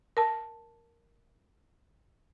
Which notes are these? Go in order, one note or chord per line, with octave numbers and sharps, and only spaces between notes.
A#4 A5